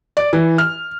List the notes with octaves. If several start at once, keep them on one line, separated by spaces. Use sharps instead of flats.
D5
E3
F6